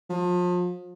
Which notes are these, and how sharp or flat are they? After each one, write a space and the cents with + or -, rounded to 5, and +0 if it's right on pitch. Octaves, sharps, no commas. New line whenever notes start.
F3 +35